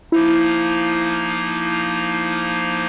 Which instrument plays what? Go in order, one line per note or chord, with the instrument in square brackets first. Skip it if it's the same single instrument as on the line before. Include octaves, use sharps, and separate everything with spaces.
[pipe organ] F3 A#3 D#4 [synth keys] E4